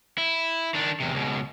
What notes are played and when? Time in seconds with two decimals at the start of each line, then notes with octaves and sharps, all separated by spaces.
0.18 E4
0.74 D#3 D4
1.00 E2 C3
1.14 C#2 B2